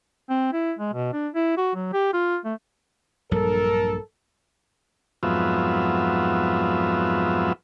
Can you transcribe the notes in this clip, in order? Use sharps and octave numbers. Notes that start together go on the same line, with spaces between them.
C4
E4
G#3
B2
D4
E4
F#4
F#3
G4
F4
A3
A#1 G2 F#3 A4 A#4
F2 G#2 F#3 B3 F4 E5